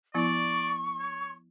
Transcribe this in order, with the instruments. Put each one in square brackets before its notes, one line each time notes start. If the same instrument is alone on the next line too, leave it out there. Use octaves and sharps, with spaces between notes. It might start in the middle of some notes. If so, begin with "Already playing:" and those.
[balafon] F3 B3 E4 [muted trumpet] D5 [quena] C#6
[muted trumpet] C#5